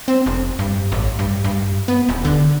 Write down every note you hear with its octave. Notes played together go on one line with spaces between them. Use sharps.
C4
F1
G2
A1
G2
G2
B3
D#1
D3